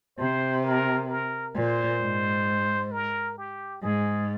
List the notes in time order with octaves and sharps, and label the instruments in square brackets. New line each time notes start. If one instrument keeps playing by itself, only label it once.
[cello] C3 [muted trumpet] C5
[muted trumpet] A#4
A#4
[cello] A#2 [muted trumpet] C5
[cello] G#2
[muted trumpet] A#4
G4
[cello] G#2 [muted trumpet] G#4